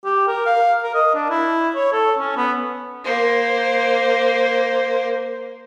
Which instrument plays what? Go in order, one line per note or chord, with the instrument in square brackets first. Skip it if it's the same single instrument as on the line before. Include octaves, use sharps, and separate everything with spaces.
[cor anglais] G4
A#4
F5
A#4
D#5
D4
E4
C#5
A4
C#4
B3
[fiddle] A#3 C5